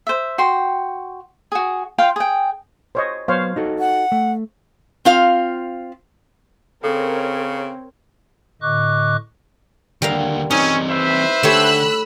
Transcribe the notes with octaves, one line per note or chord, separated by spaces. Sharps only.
C5 E5
F#4 G5 C6
F#4 G#4
F4 F5 G5 C6
G#4 G5
C5 C#5 D#5
F#3 B3 C5 C#5 F5
D#4 F#4 A4
F#5
A3
C4 F4 F5
C#3 C4 A4 A#4 C#5
A2 D3 D#5 C#6 D6 F#6
D#2 D3 G3 A#4 F5
E3 C4 C#4 D#4
B4 C5 E5
D3 A3 G4 C#5 B5 E6 F#6